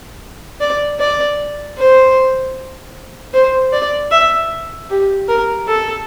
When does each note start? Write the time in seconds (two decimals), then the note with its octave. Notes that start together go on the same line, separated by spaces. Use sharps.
0.60 D5
1.00 D5
1.78 C5
3.34 C5
3.72 D5
4.11 E5
4.90 G4
5.28 A#4
5.67 A4